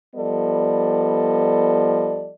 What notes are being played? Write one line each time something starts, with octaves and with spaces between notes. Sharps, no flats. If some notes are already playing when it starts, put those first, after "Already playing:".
F3 G3 B3 A4 D5 D#5